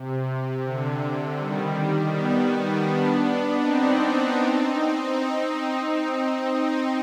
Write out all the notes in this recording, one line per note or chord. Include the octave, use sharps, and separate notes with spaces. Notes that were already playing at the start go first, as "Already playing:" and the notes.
Already playing: C3
D3
D#3 G3
G3 B3
B3 D4
C4 D#4
C4 D#4
C4 D#4